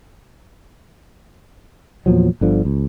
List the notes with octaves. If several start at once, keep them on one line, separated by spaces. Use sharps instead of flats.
E2 A#2 F3 F#3
G1 D3 F3
C#2